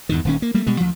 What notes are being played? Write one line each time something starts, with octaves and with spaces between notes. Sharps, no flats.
E2 G2 D#3
D#1 D#2 C#4
A#3
G3 A3 A#3
B2 G3 G#3
D2 F3